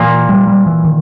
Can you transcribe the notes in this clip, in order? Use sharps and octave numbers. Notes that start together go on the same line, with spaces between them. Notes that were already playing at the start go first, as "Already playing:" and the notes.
Already playing: A#2 E3 A#3
G3
G3
E3
D#3